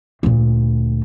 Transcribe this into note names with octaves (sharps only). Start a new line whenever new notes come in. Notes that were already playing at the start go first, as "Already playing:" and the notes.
D2 A#2